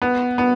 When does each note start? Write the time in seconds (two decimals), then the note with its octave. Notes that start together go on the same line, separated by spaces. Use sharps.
0.02 B3
0.38 B3